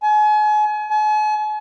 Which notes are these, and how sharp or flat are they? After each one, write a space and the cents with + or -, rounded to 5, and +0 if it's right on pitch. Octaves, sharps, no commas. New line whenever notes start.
G#5 +35
G#5 +45